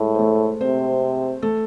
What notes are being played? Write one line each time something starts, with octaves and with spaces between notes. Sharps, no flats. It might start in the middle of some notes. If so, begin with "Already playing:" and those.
Already playing: A2 G#3 G#4
C5
A3 A4
C3 C4 C5
A3 A4